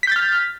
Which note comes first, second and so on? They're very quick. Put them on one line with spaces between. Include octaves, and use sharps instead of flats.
B6 G6 A6 F6